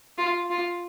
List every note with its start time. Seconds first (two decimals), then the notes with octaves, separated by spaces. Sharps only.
0.18 F4
0.50 F4